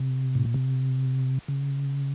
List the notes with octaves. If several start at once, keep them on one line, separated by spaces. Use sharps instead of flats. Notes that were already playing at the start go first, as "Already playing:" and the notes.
Already playing: C3
A2
A#2
C3
C#3